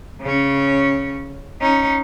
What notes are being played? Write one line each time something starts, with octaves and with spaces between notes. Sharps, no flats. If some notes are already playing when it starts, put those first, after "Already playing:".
C#3 C#4
C#4 D#4